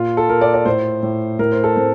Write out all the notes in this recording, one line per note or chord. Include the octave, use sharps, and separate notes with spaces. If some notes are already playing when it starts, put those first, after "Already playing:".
Already playing: A#2 F4
A4
A#2 A#4
D5
D5
A2 C5
A2
A2 A#4
C5
A4
A2 C4